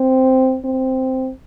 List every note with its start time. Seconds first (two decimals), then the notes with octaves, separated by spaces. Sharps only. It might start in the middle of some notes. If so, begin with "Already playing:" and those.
Already playing: C4
0.65 C4